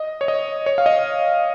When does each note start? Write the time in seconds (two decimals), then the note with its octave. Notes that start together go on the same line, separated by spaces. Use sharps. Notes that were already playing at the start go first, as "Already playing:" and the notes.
Already playing: D#5
0.21 C#5
0.28 D#5
0.66 C#5
0.78 F5
0.86 D#5